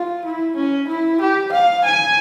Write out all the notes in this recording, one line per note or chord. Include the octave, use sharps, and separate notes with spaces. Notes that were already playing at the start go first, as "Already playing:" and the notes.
Already playing: F4
E4
C#4
E4
G4
F5
G#5